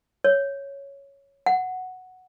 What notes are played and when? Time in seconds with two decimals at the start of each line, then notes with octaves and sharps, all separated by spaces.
0.24 C#5
1.46 F#5